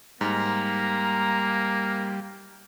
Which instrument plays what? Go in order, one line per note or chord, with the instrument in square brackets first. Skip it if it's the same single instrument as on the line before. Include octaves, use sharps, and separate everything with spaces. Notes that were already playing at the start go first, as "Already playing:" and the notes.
[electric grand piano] G#2 [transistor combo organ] G3 [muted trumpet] A#3 [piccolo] A#5